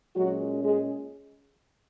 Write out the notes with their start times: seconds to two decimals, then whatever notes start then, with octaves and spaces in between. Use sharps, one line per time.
0.15 A#2 F#3 G#3 C#4 F#4
0.64 G#3 G#4